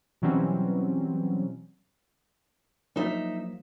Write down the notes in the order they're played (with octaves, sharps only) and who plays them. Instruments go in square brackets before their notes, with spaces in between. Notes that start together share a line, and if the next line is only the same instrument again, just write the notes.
[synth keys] B2 E3 F#3 G3 C4 C#4
[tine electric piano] F3 F#3 A#3 [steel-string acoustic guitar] D#4 E5